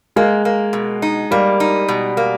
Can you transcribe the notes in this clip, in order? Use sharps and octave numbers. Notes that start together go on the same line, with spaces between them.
G#3 A#3
A#3
B2
D#4
G3 A#3
D#4
B2
A#3